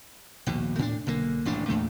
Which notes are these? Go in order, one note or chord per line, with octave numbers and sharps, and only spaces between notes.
A#1 D#2 B2
A2 C#4 D4
B1 D3 A#3
D#1 A1 G#2 D4
E2 A#2 A3